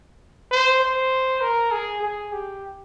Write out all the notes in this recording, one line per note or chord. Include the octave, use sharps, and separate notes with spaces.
C5
C5
A#4
G#4
G#4
G4